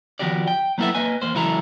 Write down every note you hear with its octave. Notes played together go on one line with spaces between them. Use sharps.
D#3 F3 B3 F#4 G4 D5
G5
F#3 A#3 B3 E4 A4 E5
A#3 B4 D#5 G#5
E2 A#3 C5
C#2 E3 F#3 E4 A4 A#5